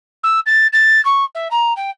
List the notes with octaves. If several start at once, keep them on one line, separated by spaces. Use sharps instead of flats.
E6
A6
A6
C#6
E5
A#5
G5